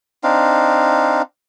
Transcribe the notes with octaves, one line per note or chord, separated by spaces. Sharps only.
C4 D4 D#4 F5